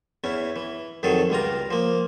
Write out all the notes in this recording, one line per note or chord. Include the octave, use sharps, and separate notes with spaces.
E2 C#4 E4
E3
F2 D#3 F#3 G#4 A4
C#2 G3 F4 A#5
F3 A#3